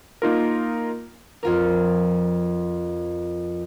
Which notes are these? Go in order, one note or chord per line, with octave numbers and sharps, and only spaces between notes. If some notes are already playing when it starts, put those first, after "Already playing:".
A#3 D#4 F4 A#4
F2 F4 A#4